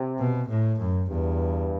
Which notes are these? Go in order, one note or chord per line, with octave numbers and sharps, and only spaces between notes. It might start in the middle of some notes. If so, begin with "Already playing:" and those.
Already playing: C3
B2
A2
F#2
E2 G2